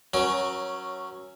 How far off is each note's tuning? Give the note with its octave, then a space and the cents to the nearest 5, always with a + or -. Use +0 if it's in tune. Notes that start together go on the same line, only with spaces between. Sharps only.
F#3 +0 C#4 -5 A#4 +35